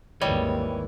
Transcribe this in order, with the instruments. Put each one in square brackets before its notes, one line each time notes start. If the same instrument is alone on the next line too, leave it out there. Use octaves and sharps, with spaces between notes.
[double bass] G#1 D#2 [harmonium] D#3 E3 E4 [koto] G3 [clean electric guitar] C#5 D#5